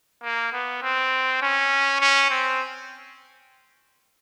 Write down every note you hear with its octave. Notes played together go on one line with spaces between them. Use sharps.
A#3
B3
C4
C#4
C#4
C4